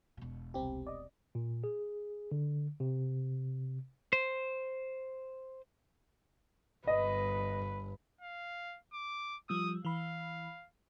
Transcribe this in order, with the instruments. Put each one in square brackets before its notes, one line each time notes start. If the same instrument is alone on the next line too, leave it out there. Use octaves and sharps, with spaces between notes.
[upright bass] E1 B2
[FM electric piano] C2 C4 G4
D5 D#5
[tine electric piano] A#2
G#4
D3
C3
[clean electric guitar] C5
[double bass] G1 [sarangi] B4 [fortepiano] D#5
[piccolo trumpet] F5
D6
[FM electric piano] F3 G3 E6 [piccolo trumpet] D#6
[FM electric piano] E3 B5 [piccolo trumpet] F5